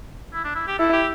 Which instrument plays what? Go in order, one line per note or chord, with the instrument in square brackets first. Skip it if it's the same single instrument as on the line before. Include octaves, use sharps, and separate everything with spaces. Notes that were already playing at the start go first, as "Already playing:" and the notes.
[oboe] E4
D4
E4
G4
[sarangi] E4 [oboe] A4
[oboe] G4